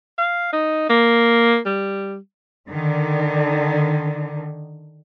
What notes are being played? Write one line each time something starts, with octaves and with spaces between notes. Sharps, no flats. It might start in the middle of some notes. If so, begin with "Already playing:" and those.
F5
D#4
A#3
G3
D3 D#3